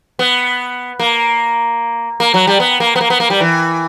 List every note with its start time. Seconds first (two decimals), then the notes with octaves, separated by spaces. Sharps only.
0.19 B3
0.99 A#3
2.20 A#3
2.34 F#3
2.47 G3
2.60 B3
2.80 A#3
2.96 B3
3.01 A#3
3.10 B3
3.20 A#3
3.30 G3
3.40 E3